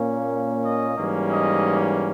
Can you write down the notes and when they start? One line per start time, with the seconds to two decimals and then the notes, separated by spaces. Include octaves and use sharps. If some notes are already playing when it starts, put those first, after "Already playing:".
Already playing: A#2 A#3 C#4
0.65 D#5
0.97 G#2 E3 G3 A#3 C#4
1.31 D#5